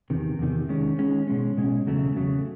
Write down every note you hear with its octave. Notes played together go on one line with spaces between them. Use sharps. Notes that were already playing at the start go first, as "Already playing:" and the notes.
E2 C3 D#3
E2 C3 D#3
D#3 G#3 C#4
D#3 G#3 C#4
B2 G#3 C#4
B2 G#3 C#4
E2 C#3 F#3 A3
E2 C#3 F#3 A3